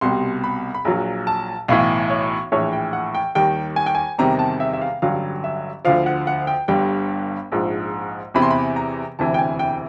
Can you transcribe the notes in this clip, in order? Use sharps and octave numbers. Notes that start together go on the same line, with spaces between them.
C2 B2 G3 C6
B5
B5
A#1 A#2 F#3 A#5
A5
B1 A2 E3 F5
C#5
A#1 A2 E3 C#5
G5
F#5
G5
D#2 D#3 G3 G5
G#5
G5
G#5
E2 C3 D#3 G3 A#5
A5
E5
E5
F5
A1 G2 D3 F#3 F5
E5
D2 D3 F3 F5
F#5
F#5
G5
G1 G2 D3 G3 G5
A#1 G#2 F3
E2 C3 E3 B5
C6
B5
A#5
E1 D2 C3 E3 A5
G5
G#5
G5